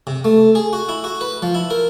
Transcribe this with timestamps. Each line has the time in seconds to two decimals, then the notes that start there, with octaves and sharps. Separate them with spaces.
0.07 C3
0.24 A3
0.55 G#4
0.73 F#4
0.89 E4
1.04 F#4
1.21 B4
1.42 F3
1.54 E4
1.70 A#4